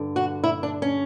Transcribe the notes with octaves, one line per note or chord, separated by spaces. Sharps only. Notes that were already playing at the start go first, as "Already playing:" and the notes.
Already playing: G2 D3
F#4
E4
D4
C#4